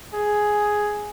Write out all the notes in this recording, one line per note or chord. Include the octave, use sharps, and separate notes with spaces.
G#4